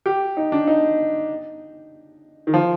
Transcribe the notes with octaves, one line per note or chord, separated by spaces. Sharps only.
G4
D#4
D4
D#4
D#3
F3